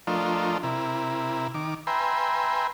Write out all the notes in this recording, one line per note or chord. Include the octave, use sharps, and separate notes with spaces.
F3 A3 D4 F4 A#4 D#5
C3 E4 A#4
D#3 D6
B4 E5 G5 G#5 A#5 C6